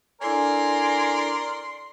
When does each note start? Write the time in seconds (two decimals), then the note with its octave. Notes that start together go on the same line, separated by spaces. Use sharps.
0.22 D4 E4 A4 A#4 D5 G#5 C6